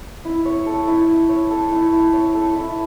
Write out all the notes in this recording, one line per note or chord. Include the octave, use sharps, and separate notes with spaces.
E4
C#5
A4
E4
E4
C#5
A4
E4
E4
C#5
A4
E4